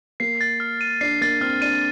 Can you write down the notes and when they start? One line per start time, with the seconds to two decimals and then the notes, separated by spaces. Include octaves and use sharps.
0.20 A#3 C7
0.41 A6
0.60 F6
0.81 D#7
1.01 D4 C7
1.21 A#3 A6
1.41 C4 F6
1.62 D4 D#7